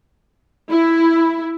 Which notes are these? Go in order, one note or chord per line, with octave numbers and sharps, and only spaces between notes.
E4